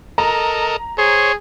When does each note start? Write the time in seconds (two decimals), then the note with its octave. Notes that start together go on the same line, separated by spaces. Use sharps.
0.18 A4 A#4 D#5 A#5
0.98 G#4 C5 C#5